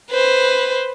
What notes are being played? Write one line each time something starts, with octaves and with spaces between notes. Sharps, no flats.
B4 C5